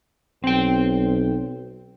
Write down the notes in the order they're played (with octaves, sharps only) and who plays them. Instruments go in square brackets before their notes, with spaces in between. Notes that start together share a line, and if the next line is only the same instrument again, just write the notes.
[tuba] B1 [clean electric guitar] C4 G5